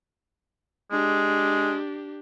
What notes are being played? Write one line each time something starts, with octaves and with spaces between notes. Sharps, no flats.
G#3 D4 G4